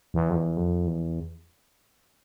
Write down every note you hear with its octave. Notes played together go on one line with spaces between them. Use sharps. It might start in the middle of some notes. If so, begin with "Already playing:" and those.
E2
F2
E2
F2
E2